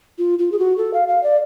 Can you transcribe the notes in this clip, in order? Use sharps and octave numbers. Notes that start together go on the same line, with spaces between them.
F4
F4
G#4
F#4
A4
F5
F5
D5